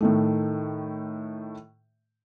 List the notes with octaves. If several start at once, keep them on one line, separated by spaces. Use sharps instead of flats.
A2 D#3 A3